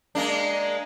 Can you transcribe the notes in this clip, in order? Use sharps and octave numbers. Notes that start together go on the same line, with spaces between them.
G#3 A#3 D4